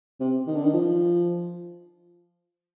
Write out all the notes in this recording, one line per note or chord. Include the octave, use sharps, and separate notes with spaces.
C3
D#3
D3
D#3
F3